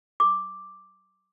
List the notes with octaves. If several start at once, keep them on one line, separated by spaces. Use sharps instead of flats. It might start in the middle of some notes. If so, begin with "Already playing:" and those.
D6